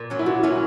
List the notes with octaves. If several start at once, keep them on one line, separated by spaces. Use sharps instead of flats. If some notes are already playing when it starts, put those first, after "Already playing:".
Already playing: A#2
F#3 C#4
E4
A#2 F#4
F#3 C#4 E4